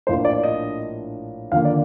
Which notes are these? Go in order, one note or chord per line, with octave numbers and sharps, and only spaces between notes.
A#1 A2 F3 A#3 D4 C5
D5
D#5
D#2 D3 F3 A#3 F5
D5